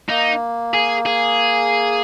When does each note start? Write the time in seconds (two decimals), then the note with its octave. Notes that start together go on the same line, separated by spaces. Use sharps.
0.09 A#3 D#4
0.74 G#4
1.06 G#4